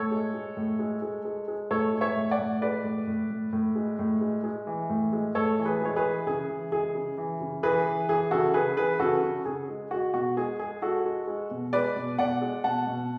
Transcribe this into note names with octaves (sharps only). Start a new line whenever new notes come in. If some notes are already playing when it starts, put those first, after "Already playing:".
Already playing: A2 A4 C#5
G#3
G#3
A2
G#3
G#3
G#3
G#3
A2 A4 C#5
G#3
C#5 E5
A2
D5 F#5
A2
G#3 B4 D5
A2
A2
A2
A2
G#3
A2
G#3
G#3
E3
A2
G#3
A2 A4 C#5
E3
G#4 B4
G#3 C#5
G#4 B4
E3
C#3 G#4
E3
G#3 G#4
C#3
E3
C#3
E3 G#4 B4
E3
E3 G#4
C#3 F#4 A4
C#3 G#4 B4
E3 G#4 B4
C#3 F#4 A4
C#3
C#3 G#4
G#3
G#3 F#4
B2 F#4
G#3 G#4
G#3 G#4
G#3 F#4 A4
G#3
G#3
B2
G#3 B4 D5
B2
B2 D5 F#5
G#3
B2 F#5 A5
B2